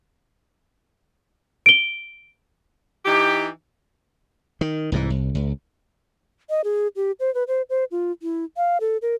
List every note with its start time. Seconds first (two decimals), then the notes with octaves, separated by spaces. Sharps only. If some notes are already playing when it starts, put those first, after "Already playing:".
1.66 D7 G7
3.05 E3 D#4 G4
4.61 D#3
4.92 C2 G#2 D#3 E3
5.10 C2
5.35 C#2
6.50 D#5
6.64 G#4
6.96 G4
7.20 C5
7.35 B4
7.48 C5
7.70 C5
7.91 F4
8.22 E4
8.57 F5
8.81 A4
9.02 A#4